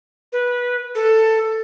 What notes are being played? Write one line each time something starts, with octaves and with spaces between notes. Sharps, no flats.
B4
A4